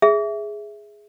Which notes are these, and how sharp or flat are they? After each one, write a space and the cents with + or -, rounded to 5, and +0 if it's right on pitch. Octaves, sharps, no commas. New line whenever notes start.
G#4 +0 E5 +0